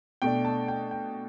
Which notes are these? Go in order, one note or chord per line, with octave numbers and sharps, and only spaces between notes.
B2 A3 D4 G5
A5
G5
G5